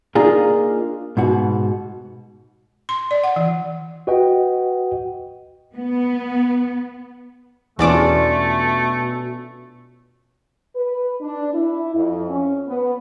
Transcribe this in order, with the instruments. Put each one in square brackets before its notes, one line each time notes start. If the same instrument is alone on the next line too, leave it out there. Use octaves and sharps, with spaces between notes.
[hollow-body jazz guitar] A#3 D4 D#4 F4 G#4
G#2 B2 F#4
[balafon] C6
D5
F#5
E3
[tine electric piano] F#4 B4 D#5 F#5 G5
[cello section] B3
[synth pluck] E2 D5 D6 [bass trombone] B2 [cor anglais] A3 [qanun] C#4 D4 F4
[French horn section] B4
D4
E4
F2
C#4
B3